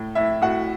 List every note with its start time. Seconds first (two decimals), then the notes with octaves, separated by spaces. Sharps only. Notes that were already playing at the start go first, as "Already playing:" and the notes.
Already playing: A2
0.15 A2 E4 E5
0.41 A2 F#4 F#5